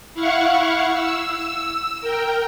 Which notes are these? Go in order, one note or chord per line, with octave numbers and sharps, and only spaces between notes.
E4 F5 F#5 C#6
E6
A#4 G5